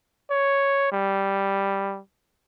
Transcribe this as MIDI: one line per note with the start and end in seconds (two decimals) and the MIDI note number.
0.31 0.91 73
0.92 2.00 55